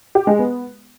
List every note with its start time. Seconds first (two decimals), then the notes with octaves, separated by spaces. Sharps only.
0.15 G4
0.27 G#3
0.39 B3